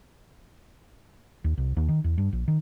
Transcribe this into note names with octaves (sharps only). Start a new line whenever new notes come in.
D#2
C2
D#2
D#3
E2
G2
A#1
D#3